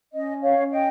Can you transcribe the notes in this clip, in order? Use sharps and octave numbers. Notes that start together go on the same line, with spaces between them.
C#4 D#5
C#5 F5
C#4
D#5 G5